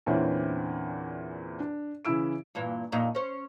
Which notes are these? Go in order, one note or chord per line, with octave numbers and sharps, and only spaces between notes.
E2 A#2 D3 E3 C4 C#4
D4
C#3 E3 E4 E6 D7
G2 A#2 E3
F2 A#2 D#4
C#4 C5